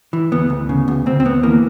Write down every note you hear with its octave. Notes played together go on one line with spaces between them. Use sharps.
E3
D2 B3
D2
C#3
D2
D2 C4
C4
D2 B3
E3 A#3